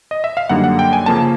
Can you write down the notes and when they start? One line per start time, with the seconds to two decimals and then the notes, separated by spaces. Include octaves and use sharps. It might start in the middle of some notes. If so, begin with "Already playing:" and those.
0.11 D#5
0.24 E5
0.37 F5
0.49 F#2 D3 G3 A#3 D#4 F#5
0.64 F#5
0.79 G5
0.93 G#5
1.06 C#3 F3 A#3 C#4 A5